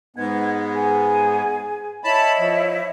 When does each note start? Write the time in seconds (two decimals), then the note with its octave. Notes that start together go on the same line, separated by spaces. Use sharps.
0.16 G#2 B3 D#5 G#6
0.72 G#4
2.04 E4 C#5 D#5 A5 B5
2.39 F3